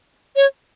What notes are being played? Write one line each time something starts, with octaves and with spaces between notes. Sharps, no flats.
C#5